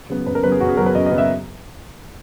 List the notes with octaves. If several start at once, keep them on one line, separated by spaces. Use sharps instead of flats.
C#3 F#3 B3
F#2 B4
A#4
C#3 F#3 B3 B4
G#4
F#2 F#4
G#4
C#3 F#3 B3 A#4
B4
F#2 D#5
D#5
C#3 F#3 B3
E5